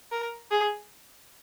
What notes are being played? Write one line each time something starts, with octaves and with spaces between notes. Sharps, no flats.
A#4
G#4